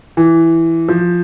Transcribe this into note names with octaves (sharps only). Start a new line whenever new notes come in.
E3
F3